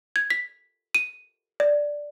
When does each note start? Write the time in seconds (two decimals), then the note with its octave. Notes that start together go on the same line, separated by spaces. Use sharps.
0.16 G#6
0.30 B6
0.95 D#7
1.60 D5